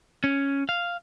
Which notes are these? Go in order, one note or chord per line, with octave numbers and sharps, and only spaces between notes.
C#4
F5